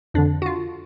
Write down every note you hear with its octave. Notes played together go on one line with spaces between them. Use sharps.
F2 D3 D4
F#4
F4